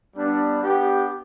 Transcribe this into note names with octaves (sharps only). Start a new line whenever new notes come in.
G3 B3 D4
B3 D4 G4